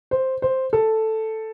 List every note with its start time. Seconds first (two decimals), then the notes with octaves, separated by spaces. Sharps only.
0.11 C5
0.42 C5
0.73 A4